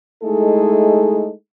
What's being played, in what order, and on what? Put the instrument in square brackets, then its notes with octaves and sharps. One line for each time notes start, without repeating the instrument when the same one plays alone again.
[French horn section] G#3 A3 D#4 E4 G#4 A4